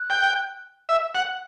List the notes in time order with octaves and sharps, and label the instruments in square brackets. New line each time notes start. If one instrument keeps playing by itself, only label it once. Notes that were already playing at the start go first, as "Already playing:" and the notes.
Already playing: [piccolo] F#6
[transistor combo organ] G5
E5
F#5